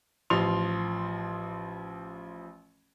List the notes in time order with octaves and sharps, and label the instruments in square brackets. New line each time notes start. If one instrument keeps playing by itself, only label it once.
[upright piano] A1 F3 C6 F7